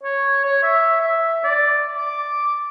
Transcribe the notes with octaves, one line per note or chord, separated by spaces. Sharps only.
C#5
C#5
E5
E5
D5
D6